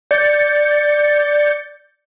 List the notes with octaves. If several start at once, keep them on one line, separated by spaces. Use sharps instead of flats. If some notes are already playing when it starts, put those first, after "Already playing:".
D5 G6 A6 C#7